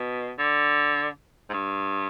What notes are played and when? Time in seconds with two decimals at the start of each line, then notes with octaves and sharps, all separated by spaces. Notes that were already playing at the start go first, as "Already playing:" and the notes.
Already playing: B2
0.39 D3
1.50 G#2
1.53 G2